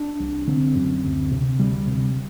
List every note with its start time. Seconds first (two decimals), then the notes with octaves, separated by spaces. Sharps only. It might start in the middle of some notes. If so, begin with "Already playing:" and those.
Already playing: D4
0.20 C2
0.47 D3 C4
0.75 F#2
1.04 D2
1.31 C3
1.59 D2 G3
1.87 C3